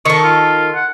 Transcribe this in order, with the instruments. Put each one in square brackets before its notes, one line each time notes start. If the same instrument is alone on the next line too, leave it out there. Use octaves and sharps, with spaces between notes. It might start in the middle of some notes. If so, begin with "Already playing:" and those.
[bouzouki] D#3 A4 [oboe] C#6
[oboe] F4
F#5